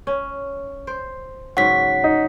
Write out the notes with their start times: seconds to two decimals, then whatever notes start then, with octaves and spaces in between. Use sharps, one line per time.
0.07 C#4
0.87 C5
1.57 G#2 C#3 F#3 F#5 B6
2.04 D#4